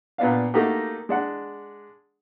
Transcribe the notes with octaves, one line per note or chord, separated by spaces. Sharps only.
A#2 B3 D4 F5
A3 A#3 D#4 F#4 G4
G#3 D4 F#5